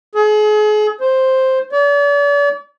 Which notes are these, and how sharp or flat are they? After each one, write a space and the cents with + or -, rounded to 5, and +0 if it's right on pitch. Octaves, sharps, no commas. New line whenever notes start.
G#4 +40
C5 +5
D5 -40